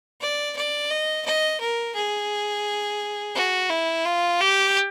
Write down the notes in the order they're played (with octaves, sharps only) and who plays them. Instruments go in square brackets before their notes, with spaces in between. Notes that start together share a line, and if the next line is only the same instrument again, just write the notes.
[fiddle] D5
D5
D#5
D#5
A#4
G#4
F#4
E4
F4
G4